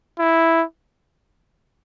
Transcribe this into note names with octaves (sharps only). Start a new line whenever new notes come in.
E4